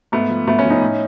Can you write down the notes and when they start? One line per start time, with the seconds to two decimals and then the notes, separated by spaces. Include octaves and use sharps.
0.12 G#2 A3 B3
0.30 F3
0.47 G#2 A3 B3
0.59 B3 C#4
0.65 F3
0.70 C#4 D#4
0.82 A2